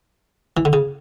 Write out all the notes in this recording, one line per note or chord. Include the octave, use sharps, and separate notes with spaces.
E3
D3
C#3